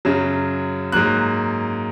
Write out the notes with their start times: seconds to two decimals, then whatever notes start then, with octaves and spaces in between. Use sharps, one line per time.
0.05 F#2 C#3 F#3
0.92 G#2 F#3 A#3 F#6